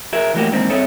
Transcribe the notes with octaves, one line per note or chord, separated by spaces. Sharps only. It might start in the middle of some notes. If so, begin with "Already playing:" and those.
F#4 G#4 A#4 E5
E3 F#3 A3 A#3 F#4 G4
D#3 E3 G#3 A#3 C4 D4
G2 C4 G#4 A4 C#5 E5